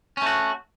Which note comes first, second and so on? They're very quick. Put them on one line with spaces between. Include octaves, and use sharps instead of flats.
C#4 A3 F#4